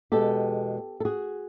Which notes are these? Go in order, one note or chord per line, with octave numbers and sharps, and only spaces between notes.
E2 B2 G#3 G4 A4
A4
F#4 G#4